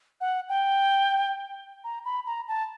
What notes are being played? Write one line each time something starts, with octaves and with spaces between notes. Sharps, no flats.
F#5
G5
A#5
B5
A#5
A5